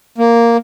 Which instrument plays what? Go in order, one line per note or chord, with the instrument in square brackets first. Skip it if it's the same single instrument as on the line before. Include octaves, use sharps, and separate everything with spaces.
[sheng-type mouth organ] A#3